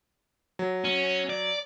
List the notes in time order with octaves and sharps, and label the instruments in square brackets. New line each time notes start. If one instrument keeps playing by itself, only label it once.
[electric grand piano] F#3
[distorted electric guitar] C#4
D5